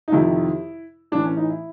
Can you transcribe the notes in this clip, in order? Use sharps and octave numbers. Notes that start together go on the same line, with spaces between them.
D#4
F2 C3 D#3 E4
A2 E3 D4
C#4
D#4
E4